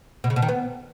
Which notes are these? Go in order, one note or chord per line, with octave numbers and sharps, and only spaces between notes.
B2
C#3
B2
D#3
B3